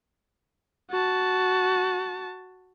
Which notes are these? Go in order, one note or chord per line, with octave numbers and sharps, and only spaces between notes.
F#4 A5